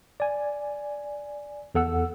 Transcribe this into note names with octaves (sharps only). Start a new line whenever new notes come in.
D5 G#5
E2 A4 F#5 E6